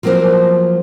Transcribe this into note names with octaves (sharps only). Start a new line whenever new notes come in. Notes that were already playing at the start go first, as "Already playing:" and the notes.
F3 F#3 A#3 C4 A#4 C5